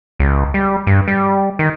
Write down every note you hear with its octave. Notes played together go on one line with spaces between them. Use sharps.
C#2
G3
G2
G3
D#3